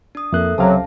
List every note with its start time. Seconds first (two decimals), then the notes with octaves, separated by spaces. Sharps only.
0.15 D4 D#6
0.33 F2 A#3 A4 A#4 E5 F#6
0.58 C#2 C3 F#3 C#4 F5 A5